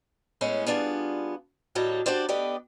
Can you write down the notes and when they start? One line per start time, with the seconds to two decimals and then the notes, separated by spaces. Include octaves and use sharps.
0.41 A2 G#3 B3 C#4
0.66 G3 B3 D4 F4 G#4
1.75 D2 A2 F#3 G3 D#5 A5
2.06 D4 F#4 G4 C5 D5
2.28 A3 B3 G4 B4 D5 D#5